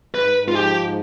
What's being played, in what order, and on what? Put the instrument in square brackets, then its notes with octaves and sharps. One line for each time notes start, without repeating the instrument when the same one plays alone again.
[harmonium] G#2 [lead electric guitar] B4
[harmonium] G#2
[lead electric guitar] F4
[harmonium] F3 [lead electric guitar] G4
[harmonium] G#2